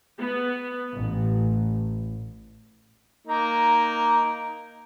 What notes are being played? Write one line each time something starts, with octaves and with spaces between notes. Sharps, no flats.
B3
A1
A#3 D#4